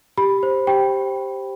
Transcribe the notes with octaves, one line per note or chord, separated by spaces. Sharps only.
G4 B5
C5
G4 G5